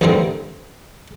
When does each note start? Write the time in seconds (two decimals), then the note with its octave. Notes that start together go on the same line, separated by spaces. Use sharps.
0.01 A1 G2 D3 E3 C4 A#4